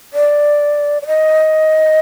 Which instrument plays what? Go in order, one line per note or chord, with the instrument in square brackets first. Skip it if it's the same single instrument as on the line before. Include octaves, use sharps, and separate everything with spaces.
[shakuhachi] D5
D5
D#5